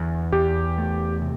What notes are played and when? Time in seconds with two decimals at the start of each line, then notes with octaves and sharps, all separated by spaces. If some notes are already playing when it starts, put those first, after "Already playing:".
Already playing: E2 D3
0.32 E2 G4
0.78 A3
1.22 C3